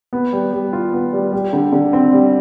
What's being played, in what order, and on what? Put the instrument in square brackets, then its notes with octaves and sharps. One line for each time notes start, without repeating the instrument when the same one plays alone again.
[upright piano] B3
G3
G3
F4
B3
G3
G3
D3
D3
C4
G3